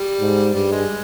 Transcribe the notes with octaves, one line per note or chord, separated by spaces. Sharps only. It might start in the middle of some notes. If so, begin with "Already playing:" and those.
Already playing: G3
G#2
G2 G3
G#3